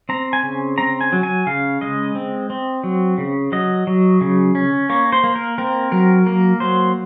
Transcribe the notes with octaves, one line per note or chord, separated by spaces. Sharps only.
C4 A#5
G#5
C#3
C4 A#5
G#5
F#3
G#5
C#3 F5
G#3 D#5
C4
C4
F#3
C#3
F#3 D#5
F#3
C#3
C#4
A#3 C#5
C5
A#3
A#4
C4 A#4
F#3 A#4
A#3 A#4
F#3 C5